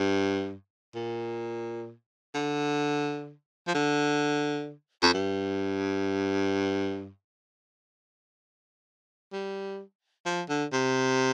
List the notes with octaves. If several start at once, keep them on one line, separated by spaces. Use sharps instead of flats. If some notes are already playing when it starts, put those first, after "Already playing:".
Already playing: G2
A#2
D3
F3
D3
F2
G2
G3
F3
D3
C3